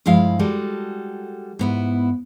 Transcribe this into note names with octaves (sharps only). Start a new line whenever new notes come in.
G2 F3 G#3 E4 F5
G3 G#3 F#4 A4
G#2 B3 E4